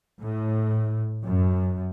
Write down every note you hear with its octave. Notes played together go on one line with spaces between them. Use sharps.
A2
F#2